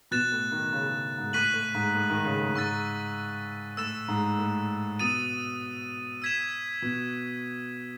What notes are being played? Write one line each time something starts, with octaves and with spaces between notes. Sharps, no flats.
B2 F#6 A6 E7
A2
D#3
C#3
C#3
G#2
A2 C#6 F#6 B6 D#7 F#7
A2
G#2
A2
D#3
C#3
A2
G#2 C#6 E6 A6
A2 E6 A6 E7
G#2
A2
B2 D#6 A6 D#7
E6 G#6 B6 E7
B2